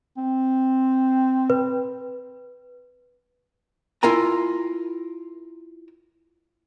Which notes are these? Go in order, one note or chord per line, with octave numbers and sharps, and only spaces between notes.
C4
B4
E4 F4 A#4 G#5 A#5